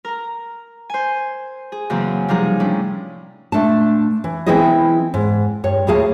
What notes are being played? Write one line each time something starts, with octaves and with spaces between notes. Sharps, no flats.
A#4 A#5
C5 G#5
G#4
F#2 C#3 E3 A#3 C4
C3 F3 G3 A#3 D#4 G#4
A2 C#4 D4 E4
A#2 A3 D4 A5
E3
E3 B3 C4 E4 G#4 D#5
G#2
G2 C#5
D#2 A2 A#3 G#4 F5 A5